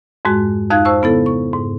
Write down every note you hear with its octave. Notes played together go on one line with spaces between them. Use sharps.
F2 G#2 G#3 F#4
F2 D#4 F5 F#6 G#6
C5 A5 C#6 E6
C#3 B3 E4 A4
C#6
G#2